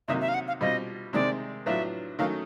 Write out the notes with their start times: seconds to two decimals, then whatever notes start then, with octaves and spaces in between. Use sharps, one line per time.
0.08 C3 D#3 F#3 A#3 D#4 E5
0.21 E5
0.29 F5
0.34 F#5
0.48 F5
0.61 B2 G3 C4 F4 D#5
1.13 C3 D#3 G#3 C4 D5
1.66 A2 F#3 B3 D4 F4 E5
2.19 D#3 F#3 A3 C#4 F5